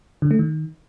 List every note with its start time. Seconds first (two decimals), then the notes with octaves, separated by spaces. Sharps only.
0.22 D3
0.31 A3
0.39 D#3